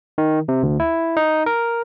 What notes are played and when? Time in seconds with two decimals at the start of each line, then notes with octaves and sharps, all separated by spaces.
0.18 D#3
0.48 C3
0.63 D2
0.80 E4
1.17 D#4
1.46 A#4